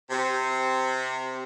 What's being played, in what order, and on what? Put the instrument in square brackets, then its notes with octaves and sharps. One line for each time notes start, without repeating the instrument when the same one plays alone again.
[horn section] C3